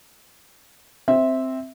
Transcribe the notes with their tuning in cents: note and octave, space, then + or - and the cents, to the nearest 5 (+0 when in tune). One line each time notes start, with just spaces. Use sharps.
C4 +0 E5 -10